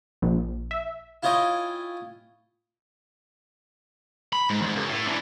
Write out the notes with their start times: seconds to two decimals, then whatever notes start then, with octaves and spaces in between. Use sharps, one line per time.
0.22 A#1
0.71 E5
1.23 E4 F4 C#5 D#5 G5 G#5
4.33 B5
4.50 G#2
4.62 E2 G#2
4.76 C#2 F#2
4.89 A2
5.06 D3 E3